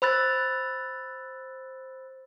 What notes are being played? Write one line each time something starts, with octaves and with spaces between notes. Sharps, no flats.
C5 B5 E6 F#6 A6